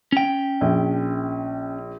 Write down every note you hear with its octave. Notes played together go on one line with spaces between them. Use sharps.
C#4 G5
A#1